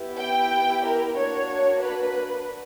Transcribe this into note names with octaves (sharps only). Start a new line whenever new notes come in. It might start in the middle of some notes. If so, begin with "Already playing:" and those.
Already playing: B3 E4 G4
G5
A#4
A#3 D4 F#4 C#5
B4